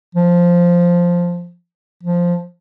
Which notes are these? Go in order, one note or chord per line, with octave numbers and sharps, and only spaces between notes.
F3
F3